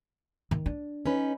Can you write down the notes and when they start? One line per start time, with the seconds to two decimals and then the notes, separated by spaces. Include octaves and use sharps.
0.51 D#3
0.66 D4
1.06 C#4 D#4 B4